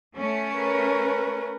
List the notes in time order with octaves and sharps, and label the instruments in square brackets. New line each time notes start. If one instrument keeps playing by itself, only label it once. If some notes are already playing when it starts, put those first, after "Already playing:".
[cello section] A3 C#4
[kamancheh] A#4 B4